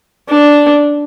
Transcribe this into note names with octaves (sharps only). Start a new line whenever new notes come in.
D4